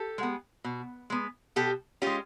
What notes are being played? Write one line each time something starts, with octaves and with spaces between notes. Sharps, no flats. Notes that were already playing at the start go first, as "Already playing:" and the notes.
Already playing: G4 A4
G#3 B3
B2
G#3 B3
B2 G4 A4
G#3 C#4 F4 G4